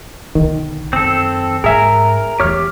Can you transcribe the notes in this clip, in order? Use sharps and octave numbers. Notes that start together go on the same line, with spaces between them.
B1 D3 D#3
F#2 C4 A4
G#2 G#4 A#4 E5 G#5
E2 A3 G4 C#5 F6